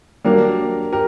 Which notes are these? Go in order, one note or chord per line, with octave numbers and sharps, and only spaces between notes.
F#3 A#3 D4 G4 A#4
G4 A#4